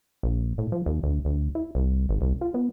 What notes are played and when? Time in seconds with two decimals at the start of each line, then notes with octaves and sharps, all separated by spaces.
0.23 A#1
0.58 A2
0.72 F3
0.86 D#2
1.03 D2
1.25 D2
1.55 E4
1.75 C2
2.09 G#1
2.21 C2
2.41 F4
2.54 B3